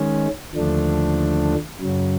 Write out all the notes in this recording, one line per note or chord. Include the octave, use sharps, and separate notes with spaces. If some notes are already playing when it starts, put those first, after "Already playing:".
Already playing: D#3 G#3 C#4
D#2 D3 F3 A3 D4
F#2 C#3 F#3